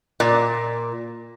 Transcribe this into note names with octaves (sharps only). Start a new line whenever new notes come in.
A#2